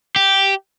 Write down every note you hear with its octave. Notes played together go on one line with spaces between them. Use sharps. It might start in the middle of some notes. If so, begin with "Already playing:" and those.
G4